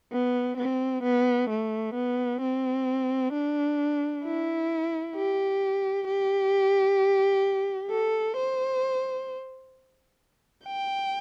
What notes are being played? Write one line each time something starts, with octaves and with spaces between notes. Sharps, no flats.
B3
C4
B3
A3
B3
C4
D4
E4
G4
G4
A4
C5
G5